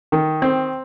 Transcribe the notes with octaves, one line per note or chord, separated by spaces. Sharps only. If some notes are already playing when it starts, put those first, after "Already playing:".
D#3
C4